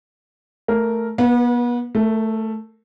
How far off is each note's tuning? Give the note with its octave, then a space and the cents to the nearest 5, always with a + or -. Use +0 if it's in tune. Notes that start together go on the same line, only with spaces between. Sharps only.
A3 +0 A#4 +0
B3 -35 B4 +0
A3 +0 A#4 -30